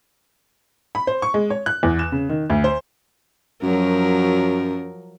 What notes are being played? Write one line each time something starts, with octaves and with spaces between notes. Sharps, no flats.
B5
C5
C#6
G#3
C#5
F#6
E2
E7
C#3
D#3
D2
C5
F#2 F3 F#3 A#4